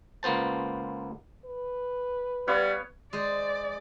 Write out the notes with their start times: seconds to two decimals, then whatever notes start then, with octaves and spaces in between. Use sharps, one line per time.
0.23 C#2 A#3 B3 C5 A5
1.45 B4
2.48 G3 B3 C#5 F5
3.13 G#3 G#4 C5 D5